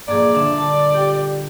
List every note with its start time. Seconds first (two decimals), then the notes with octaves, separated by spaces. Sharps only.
0.08 A#1 G2 A#3 G#4 D5
0.35 D3 D4 E5
0.58 A5
0.94 G4 G5